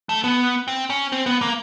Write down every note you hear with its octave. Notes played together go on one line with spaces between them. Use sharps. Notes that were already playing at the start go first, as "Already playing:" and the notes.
A3
B3
C4
C#4
C4
B3
A#3